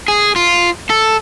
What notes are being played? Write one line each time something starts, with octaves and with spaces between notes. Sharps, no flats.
G#4
F4
A4